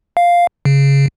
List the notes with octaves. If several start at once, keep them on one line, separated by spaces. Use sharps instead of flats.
F5
C#3